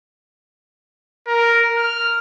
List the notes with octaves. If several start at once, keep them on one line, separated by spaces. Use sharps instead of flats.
A#4
F6